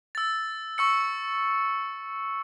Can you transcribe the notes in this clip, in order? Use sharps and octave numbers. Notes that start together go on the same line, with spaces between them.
E6 A6
C#6 E6 C#7